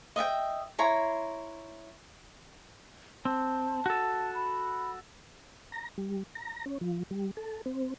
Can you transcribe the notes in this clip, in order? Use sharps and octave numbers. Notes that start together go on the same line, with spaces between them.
D#5 E5 F#5 G5
E4 C#5 A#5 C6
C4 A5
F#4 A4
B5
A#5
G3
A#5
C#4
F3
G3
A4
C4